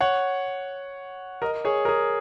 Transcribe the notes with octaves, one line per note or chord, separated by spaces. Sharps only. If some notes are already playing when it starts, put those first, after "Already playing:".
C#5 F#5
A#4 D#5
G#4 C#5
A#4
G#4